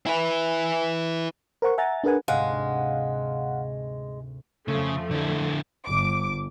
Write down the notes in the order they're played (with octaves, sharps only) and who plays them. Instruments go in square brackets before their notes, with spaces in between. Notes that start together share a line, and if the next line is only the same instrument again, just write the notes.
[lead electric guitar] E4 B4
[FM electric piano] A#4 C5 F#5 C#6
E5 F#5 G#5 A#5 A6
D4 G#4 A#4 B4 F#5 G#5
[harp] D2 G#2 C3 [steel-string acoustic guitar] G#3 [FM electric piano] F5 F#5
[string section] F2 F3 A3 [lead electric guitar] C#3
[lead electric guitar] D3 E4
[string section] G1 D6